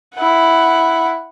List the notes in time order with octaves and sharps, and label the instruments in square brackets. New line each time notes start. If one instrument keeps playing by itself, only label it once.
[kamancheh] E4 F#5